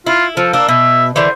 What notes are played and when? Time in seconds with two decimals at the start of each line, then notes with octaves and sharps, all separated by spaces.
0.06 E4 F4
0.37 F3 A4
0.53 A#3 D4 E6
0.68 B2 E5
1.16 D3 E3 C5